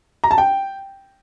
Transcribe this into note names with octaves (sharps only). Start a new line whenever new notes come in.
A#5
A5
G5